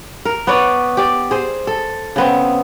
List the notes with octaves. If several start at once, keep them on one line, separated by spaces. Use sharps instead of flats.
A#4
B3 B4 C#5 D5
G4 D5
G#4 C5
A4
C#3 B3 C4